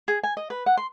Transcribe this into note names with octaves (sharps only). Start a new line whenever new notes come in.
G#4
G#5
D#5
B4
F#5
C6